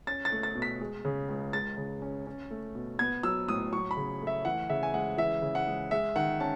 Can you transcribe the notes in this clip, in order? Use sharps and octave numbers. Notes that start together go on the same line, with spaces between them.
C#4 A6
A6
A3
A6
B2
B6
G#3
C#3
C#2
G#3 A6
C#3
C#4
C#4
A3
B2
B3 G#6
F#3 E6
A2 D#6
F#3 C#6
B5
C#3
A3
E5
E3 F#5
C#3 E5
G#5
G#3 F#5
E3 E5
C#3
F#5
G#3
G#3 E5
D#3 F#5
C#4 A5